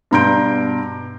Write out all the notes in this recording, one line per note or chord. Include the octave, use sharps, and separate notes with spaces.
G2 B2 A#5 C6 G6 D7